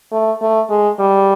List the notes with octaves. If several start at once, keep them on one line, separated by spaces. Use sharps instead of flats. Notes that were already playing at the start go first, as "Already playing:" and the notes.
A3
A3
G#3
G3